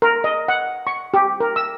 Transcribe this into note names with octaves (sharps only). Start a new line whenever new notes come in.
A#4
D#5
F#5
C#6
G4
A#4
E6